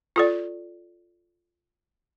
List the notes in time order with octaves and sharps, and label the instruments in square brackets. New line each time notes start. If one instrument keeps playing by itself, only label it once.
[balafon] F4 A4 D5